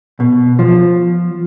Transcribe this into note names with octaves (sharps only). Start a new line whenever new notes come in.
B2
F3